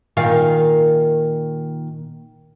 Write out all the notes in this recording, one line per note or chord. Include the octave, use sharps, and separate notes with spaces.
A#2 D#3 F5